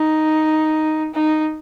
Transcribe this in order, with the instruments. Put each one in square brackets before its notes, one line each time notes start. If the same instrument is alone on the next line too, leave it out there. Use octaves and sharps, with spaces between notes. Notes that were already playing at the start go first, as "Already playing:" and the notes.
Already playing: [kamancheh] D#4
D#4